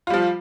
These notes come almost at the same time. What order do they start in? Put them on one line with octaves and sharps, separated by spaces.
F4 G3 F3